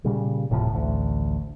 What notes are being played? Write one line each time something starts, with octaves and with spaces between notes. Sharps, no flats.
A#2 C#3 G3
D1 A2 C3 F3
A1 D2